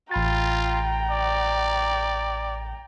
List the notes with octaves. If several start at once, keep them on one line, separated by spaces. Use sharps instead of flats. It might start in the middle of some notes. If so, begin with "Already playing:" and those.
A1 F4 G5 A#5 B5 A6
D5